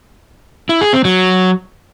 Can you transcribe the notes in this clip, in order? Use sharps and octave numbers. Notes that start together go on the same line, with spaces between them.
E4
G#4
C4
F#3